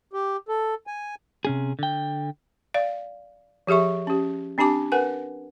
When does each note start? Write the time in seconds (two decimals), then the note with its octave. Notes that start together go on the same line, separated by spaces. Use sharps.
0.13 G4
0.49 A4
0.87 G#5
1.45 C3 C#4 G#4
1.79 D3 G5
2.74 D5 F5
3.67 F3 G4 G#4 E5 C#6
4.07 C#4 G4
4.58 C4 D4 G4 A5 D6
4.92 A#4 B4 F#5 G#5